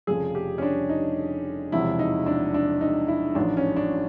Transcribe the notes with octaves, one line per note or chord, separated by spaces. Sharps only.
F1 F2 C#3 F3 G#4
G4
C#4
D4
D#4
E1 E2 C3 F3 E4
D#4
D4
D4
D#4
E4
A1 G#2 F3 D4
C#4
D4